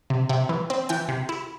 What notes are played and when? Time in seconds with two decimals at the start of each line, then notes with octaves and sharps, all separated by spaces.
0.10 C3
0.29 C3
0.49 E3
0.70 C4
0.89 E3 G5
1.09 C3
1.29 E4